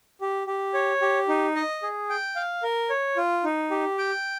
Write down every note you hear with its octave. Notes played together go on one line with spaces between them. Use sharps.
G4
G4
C#5
G4
D#4
D#5
G#4
G5
F5
A#4
C#5
F4
D#4
G4
G5